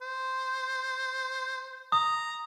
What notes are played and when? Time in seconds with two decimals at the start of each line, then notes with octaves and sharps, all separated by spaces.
0.02 C5
1.92 A#5 D#6